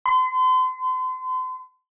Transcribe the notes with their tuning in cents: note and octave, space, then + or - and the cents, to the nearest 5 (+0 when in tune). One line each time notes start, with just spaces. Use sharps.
C6 -40